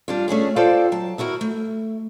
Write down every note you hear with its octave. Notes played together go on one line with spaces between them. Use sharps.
G3 D4 F4
A3 C#4 D4 G#4
F4 A4 C5 D5 G5 A5
F#3 A5
D#2 E4 F#4 A#4
A3